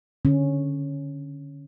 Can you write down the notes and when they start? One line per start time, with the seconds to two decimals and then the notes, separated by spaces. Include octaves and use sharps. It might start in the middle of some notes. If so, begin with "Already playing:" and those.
0.25 D3 C#4